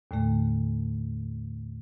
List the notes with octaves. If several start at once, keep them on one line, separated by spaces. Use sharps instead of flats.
D#2 A2 D3 A3